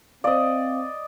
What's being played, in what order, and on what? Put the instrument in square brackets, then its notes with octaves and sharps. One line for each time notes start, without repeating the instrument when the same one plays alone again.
[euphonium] C4 [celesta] C5 F5 [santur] D5 D#5